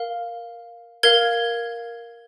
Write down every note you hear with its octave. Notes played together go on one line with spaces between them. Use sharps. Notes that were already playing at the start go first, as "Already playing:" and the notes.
Already playing: A#4 F5
A#4 F5 G#6